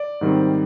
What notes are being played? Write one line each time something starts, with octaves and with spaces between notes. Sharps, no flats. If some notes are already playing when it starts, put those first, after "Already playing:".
Already playing: D5
G#2 D#3 G3 C4